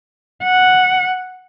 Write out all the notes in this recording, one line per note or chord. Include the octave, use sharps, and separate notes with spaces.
F#5